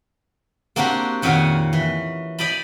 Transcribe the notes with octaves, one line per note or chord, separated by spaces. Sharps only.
A#3 C4 D4 F#4 G4
F2 A#2 D#3 C#4 F#4 F5
E3
D5 D#5 G5 A5 B5